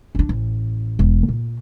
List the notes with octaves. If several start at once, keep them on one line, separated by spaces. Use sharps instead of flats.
C#4 D4
A1
E1
A#2